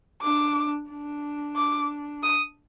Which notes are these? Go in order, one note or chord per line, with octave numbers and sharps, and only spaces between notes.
D4 D6
D4
D6
D#6